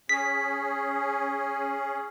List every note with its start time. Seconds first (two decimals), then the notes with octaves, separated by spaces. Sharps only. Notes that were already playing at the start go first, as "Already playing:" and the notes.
0.09 C#4 G#4 B6